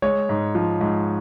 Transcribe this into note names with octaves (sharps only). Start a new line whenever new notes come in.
G#3 C#5
G#2
F3
G#2